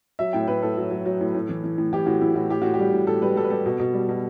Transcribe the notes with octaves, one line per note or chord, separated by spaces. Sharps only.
F#3 E5
A2 G5
A2 B4
A2 A4
F#3
F#3
F#3
A2
A2
E3
E3
A2
E3 G4
A2 F#4
E3 E4
A2 F#4
A2 G4
A2 F#4
G4
G3
A2
A2 A4
G3 B4
G3 A4
B4
G3 A4
B2
B2
G3
B2